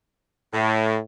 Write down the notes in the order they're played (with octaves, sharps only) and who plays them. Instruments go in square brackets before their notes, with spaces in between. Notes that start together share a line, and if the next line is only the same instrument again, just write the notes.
[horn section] A2